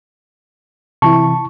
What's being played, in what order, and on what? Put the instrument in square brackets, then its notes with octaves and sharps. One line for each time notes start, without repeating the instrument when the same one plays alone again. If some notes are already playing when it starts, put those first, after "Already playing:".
[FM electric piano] C3 E3 E4 [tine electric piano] A5 C#6